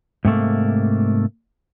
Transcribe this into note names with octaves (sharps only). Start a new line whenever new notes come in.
G#2 C3 A3 A#3